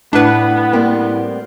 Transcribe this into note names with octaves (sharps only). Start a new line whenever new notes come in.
A2 B3 D4 B4 F#5
G3 A#3 C4